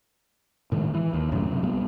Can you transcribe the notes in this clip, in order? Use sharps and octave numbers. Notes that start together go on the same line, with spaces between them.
A2 D#3 G#3
E3
D#2
A1 F#2 A2 C#3
F#2 C3
B1 G3 B3